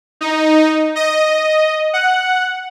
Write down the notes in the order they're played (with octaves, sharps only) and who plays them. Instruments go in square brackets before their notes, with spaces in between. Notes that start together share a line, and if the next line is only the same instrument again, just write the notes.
[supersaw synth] D#4
D#5
F#5